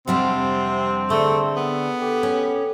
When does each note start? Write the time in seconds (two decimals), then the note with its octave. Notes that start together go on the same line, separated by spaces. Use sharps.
0.08 F2 C3 G3 C4 D4 F#5 C6
1.10 D3 A3 G#4 D5
1.57 B3
2.01 G4 A4
2.23 C#4